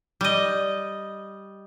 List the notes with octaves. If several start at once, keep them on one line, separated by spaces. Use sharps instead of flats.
G3 D#5